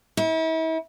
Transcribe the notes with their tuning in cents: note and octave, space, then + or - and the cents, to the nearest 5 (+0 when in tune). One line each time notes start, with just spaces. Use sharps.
E4 -40